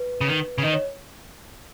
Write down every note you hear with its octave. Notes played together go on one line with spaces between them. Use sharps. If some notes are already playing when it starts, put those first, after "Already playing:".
Already playing: B4
C#3
D#3
C#3
D#3 D#5
C#5